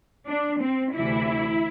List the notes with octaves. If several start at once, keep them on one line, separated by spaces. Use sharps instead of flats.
D4
C4
D2 C3 E3 E4